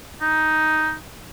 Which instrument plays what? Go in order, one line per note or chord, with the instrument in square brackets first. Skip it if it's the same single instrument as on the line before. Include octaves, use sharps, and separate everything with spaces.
[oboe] D#4